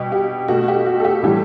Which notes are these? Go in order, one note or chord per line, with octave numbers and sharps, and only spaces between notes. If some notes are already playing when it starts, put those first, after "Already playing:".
Already playing: B2 G3 G4
G4
B2 A3 F#4
G4
F#4
A4
G4
A2 E3 G3 G4